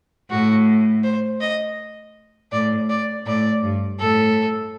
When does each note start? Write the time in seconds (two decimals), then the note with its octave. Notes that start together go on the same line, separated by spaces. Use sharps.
0.30 A2 F#4
1.04 C5
1.41 D#5
2.52 A2 D5
2.89 D5
3.26 A2 D5
3.63 G2
4.00 A2 A4